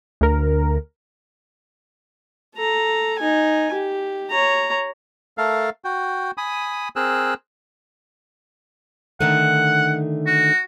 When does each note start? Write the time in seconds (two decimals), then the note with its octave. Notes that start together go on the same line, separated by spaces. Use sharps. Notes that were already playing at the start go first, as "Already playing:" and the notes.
0.21 D2 A#4
2.55 A4 A#5
3.19 D#4 G#5
3.73 G4
4.30 C#5 A#5
5.38 A3 A4 A#4 F5
5.85 F#4 G5
6.38 G#5 B5 D#6
6.96 C4 G#4 A#4 E6 F#6
9.21 D3 D#3 A3 F#5
10.27 F#4